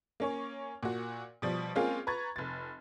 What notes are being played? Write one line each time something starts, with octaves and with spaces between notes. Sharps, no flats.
A#3 C#4 C#5
A#2 F#4
B2 F3 G3
G#3 A#3 C4 C#4 F4 F5
B4 A#5 C#6 G#6 A6
F1 A6